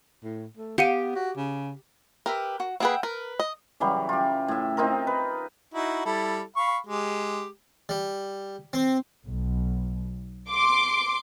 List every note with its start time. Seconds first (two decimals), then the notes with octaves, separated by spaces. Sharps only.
0.23 A2
0.57 A3
0.78 B3 G4 F5 F#5 D#7
1.16 F#4
1.37 C#3
2.26 G4 A#4 B4 E5
2.60 F#4
2.80 A#3 G#4 B4 E5 F#5 G5
3.03 A#4 B4
3.40 D#5
3.80 C#3 E3 F#3 G3
4.09 F4 G4
4.48 A2 E5
4.77 C4 D#4 F4 A#4
5.07 B4
5.74 D#4 E4 F#4
6.05 G3 E4 A4
6.57 F5 B5 C#6
6.87 G#3 G4
7.89 G3
8.73 C4
9.25 B1
10.49 C6 D6